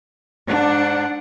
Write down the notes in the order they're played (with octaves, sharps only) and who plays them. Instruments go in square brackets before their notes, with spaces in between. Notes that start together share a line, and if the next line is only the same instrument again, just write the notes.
[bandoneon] G#2 [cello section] D4 [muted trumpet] F#5